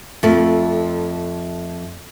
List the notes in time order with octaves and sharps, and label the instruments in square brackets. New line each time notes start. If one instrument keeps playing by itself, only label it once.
[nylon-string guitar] F2 A3